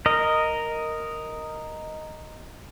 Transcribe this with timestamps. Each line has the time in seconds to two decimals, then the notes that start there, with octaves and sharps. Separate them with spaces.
0.06 A#4 D#5